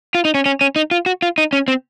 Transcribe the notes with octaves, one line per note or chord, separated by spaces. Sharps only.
F4
D#4
C#4
C#4
C#4
D#4
F4
F#4
F4
D#4
C#4
C4